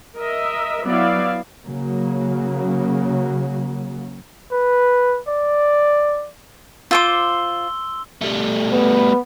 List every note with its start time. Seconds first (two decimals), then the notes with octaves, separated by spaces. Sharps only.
0.17 A#4 D#5 E5
0.85 F#3 B3 E4 D5 E5 F5
1.64 C#3 F#3 A#3
4.52 B4
5.28 D5
6.91 F4 C5 C6 D6 E6 G7
8.22 G3 A3
8.72 B3 B4